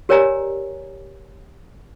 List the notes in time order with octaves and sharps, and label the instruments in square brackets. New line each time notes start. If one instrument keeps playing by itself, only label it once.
[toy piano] G4 A#4 C#5 D5 G#5 A#5